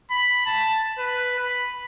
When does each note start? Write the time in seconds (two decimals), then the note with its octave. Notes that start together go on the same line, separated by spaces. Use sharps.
0.11 B5
0.46 A5
0.99 B4
1.39 B5